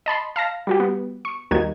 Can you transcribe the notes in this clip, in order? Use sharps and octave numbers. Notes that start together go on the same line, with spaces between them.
D#5 A5 B5 C6
F5 A5 A#6
G3 F#4 G4
B3
C#6
D#2 G3 A#3 D#4 F#4 G#6